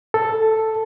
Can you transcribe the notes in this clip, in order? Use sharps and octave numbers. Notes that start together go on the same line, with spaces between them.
A4